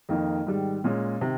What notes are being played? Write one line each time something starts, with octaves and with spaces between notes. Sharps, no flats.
F2 D#3 A#3 D#4
G#2 D#3 G3
A#2 G#3 C#4
C3 D#3